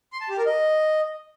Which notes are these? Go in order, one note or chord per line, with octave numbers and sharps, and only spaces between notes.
C6
A5
G4
A#4
D#5